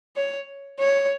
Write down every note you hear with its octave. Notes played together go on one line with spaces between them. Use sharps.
C#5
C#5